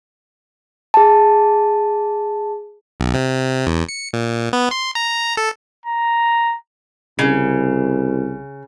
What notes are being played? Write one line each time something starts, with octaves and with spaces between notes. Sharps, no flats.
G#4 A5
B1
C3
E2
C#7
A#2
B3
C6
A#5
A4
A#5
C2 C#3